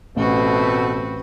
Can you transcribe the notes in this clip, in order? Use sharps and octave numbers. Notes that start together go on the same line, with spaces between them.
A1 B2 A3 C4 F#4 B4